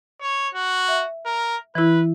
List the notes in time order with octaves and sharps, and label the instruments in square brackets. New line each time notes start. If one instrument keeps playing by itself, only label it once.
[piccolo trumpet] C#5
F#4
[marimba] E5
[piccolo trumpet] A#4
[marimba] E3 E4 [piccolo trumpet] B4